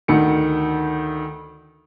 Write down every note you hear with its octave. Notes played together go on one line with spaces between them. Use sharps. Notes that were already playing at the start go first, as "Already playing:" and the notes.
D2 D#3 C#7